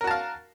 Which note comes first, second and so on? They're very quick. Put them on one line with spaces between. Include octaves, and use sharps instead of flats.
A#4 F#4 A5 F5